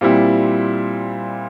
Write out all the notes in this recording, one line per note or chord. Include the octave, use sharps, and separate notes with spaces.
A#2 G3 C4 E4